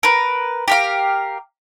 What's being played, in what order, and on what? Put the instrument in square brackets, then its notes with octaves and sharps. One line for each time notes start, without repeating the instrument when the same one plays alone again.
[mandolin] A#4 B4
G4 A#4 F5